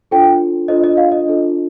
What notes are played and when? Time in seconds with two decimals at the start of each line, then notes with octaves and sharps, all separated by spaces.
0.11 D4 F4 A4 C5 G5
0.68 D4 F4 A4 C5 D#5
0.84 D#5
0.97 F5
1.12 D#5
1.26 D4 F4 A4 C5